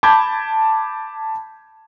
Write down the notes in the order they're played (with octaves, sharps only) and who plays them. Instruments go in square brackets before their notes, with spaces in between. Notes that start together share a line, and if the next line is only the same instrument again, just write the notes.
[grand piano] A5 B5 D6 G6 G#6